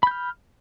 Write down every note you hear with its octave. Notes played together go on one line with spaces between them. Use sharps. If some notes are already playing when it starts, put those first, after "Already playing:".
B5 F6 G6